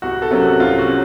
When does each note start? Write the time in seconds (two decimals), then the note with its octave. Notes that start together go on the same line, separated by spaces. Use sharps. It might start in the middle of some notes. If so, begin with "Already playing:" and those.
0.02 C2 F#4
0.22 A4
0.31 C3 F#3 A#3 C#4
0.40 F#4
0.60 C2 F4
0.78 F#4
0.88 C#4